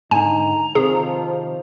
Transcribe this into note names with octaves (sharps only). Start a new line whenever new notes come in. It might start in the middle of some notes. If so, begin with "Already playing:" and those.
G#2 D3 D#4 G#5 A#5
C3 D#3 F3 G#4